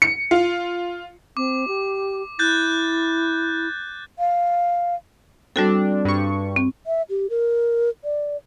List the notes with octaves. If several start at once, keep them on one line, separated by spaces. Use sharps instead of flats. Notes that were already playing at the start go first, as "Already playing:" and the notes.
C#7
F4
C4 D6
G4
E4 F#6 G6 A6
F5
G3 C4 D4 F#4 A4
G2 C#6
C4
E5
G4
A#4
D5